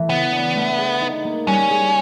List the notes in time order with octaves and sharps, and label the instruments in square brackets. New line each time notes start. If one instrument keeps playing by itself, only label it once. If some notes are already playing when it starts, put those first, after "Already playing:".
Already playing: [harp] E3 A3
[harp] C#3 [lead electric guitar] B3
[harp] D4
A3
G#4
D#4
A#3
[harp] G3 [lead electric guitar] C#4
[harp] G#4